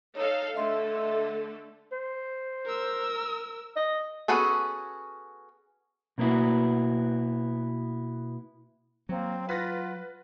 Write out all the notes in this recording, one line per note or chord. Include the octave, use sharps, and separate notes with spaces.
D#4 A4 C#5 F5
D3 A3 A4 D#5 E5 C6
C5
A#4 E6
D#5
B3 C#4 F#4 G#4 A4
B2 A#3 B3 E4 F#4
F#3 A#3 C4
F4 B4 F#5 A6 A#6